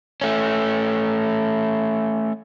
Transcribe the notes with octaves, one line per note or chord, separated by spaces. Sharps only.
A3 C#4